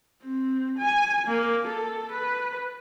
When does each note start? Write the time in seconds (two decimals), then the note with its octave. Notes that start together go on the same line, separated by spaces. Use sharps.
0.24 C4
0.79 G#5
1.27 A#3
1.68 A4
2.12 B4